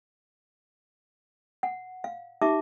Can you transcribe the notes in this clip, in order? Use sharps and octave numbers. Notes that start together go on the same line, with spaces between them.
F#5
F5
D#4 G4 E5 A5 C#6 D6